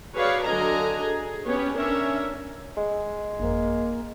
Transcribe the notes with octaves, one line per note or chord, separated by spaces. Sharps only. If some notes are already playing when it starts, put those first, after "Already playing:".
F#4 G#4 B4 C#5 D5 F5
D3 F#3 D4 D#5 G#5 A#5
G#4
B3 C#4 G4 C#5
C#4 D4 A#4 C#5 E5
G#3
G1 F2 A#3